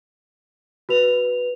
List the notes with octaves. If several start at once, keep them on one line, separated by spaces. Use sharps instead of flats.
F#4 B4 F7